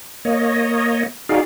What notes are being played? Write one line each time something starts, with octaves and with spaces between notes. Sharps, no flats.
A#3 C#5 D#5
D#4 F#4 G#4 D5 F5